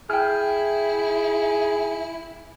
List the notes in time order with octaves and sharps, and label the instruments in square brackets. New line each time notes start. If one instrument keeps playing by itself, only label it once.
[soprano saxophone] E4 [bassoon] G#4 [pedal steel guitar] G5 F6